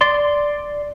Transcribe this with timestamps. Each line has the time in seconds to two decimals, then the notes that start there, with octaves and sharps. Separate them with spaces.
0.01 D5 C6